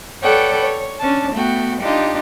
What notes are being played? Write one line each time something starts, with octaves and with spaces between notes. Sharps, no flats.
A4 B4 C#5 D5 F#5 G5
C#5
C#4 D4 A5
A3 B3 F#4 G5
D4 D#4 F4 G4